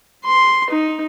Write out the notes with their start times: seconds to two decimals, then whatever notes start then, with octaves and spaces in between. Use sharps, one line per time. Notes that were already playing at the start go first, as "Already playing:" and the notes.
0.24 C6
0.70 D#4